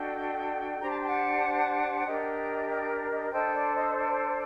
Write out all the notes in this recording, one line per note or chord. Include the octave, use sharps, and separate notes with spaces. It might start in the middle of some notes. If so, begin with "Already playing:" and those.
Already playing: D4 F#4 A4 D#5 G5
D4 G4 C5 A#5
A5
G5
F#5 A5
D4 G4 A#4 D#5 G5
D#5 G5
D#5
D4 A4 C5 D#5 G5
D5
D#5
D5